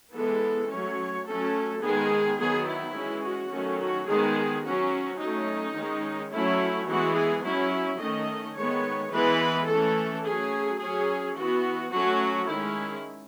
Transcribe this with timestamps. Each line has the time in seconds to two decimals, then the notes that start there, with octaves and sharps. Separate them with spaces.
0.15 E3 G#3 B3 A4
0.70 F#3 A3 C#4 C#5
1.27 F#3 A3 C#4 A4
1.83 D#3 G#3 B3 G#4
2.39 D#3 F#3 B3 G#4
2.67 E4
2.95 E3 G#3 C#4
3.24 F#4
3.51 D#3 F#3 A3 C#4
3.80 F#4
4.07 D#3 G#3 B3 G#4
4.64 F#3 C#4 F#4
5.19 F#3 A3 C#4 D#4
5.76 D#3 G#3 C#4
6.31 F#3 A3 C#4 E4
6.88 E3 G#3 B3 F#4
7.16 G#4
7.44 F#3 C#4 E4
8.00 D#3 A3 C#4 D#5
8.57 D#3 G#3 B3 C#5
9.12 E3 G#3 B3 B4
9.68 E3 A3 C#4 A4
10.25 F#3 A3 C#4 G#4
10.80 F#3 C#4 G#4
11.37 E3 B3 F#4
11.93 F#3 A3 C#4 F#4
12.49 D#3 G#3 C#4 E4